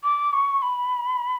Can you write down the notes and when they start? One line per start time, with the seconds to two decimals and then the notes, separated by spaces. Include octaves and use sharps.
0.04 D6
0.33 C#6
0.62 B5